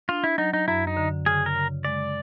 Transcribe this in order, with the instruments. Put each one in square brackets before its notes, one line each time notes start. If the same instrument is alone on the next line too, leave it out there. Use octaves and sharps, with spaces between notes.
[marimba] D4 [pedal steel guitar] F4
[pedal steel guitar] E4
[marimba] F#3 [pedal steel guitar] D#4
[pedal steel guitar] D#4
[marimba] F#2 [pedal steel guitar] E4
[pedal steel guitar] D#4
[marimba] D3
[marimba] C#3 [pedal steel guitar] G#4
[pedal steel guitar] A#4
[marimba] C#3
[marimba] G#3 [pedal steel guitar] D5